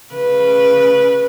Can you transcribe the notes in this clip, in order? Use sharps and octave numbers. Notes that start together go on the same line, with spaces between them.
C#3 B4